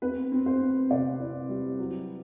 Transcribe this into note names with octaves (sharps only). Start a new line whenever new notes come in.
C4 B4
C4
C5
C4
C3 D5
E4
G3
F#3